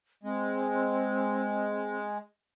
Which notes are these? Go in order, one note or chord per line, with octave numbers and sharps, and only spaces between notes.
G#3 C4